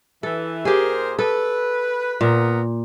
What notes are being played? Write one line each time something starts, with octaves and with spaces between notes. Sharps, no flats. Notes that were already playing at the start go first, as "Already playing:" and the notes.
E3 A4
A#2 G4 G#4 A#4 C5
A4 B4
A#2 A#3 B3 A#4